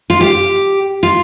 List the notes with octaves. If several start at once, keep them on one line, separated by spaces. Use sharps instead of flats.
F4
G4
F4